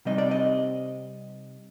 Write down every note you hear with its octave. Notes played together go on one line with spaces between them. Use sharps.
C3 G3 C4 D#4 D#5
D5
D#5